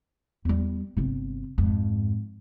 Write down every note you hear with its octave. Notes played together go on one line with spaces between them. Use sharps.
E2 G3
G1 C3
F2 G#2